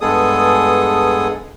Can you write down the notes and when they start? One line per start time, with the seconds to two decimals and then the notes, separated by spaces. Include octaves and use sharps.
0.01 G2 G#3 B3 G#4 A4 D#6